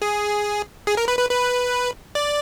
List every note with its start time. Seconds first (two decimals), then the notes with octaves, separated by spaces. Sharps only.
0.02 G#4
0.87 G#4
0.97 A#4
1.08 B4
1.19 B4
1.30 B4
2.15 D5